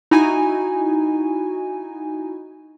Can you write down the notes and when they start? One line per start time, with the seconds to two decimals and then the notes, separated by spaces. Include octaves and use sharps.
0.11 D#4 E4 F#4 G#5